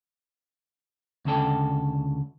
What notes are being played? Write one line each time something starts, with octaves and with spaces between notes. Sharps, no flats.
D2 C#3 A4 G5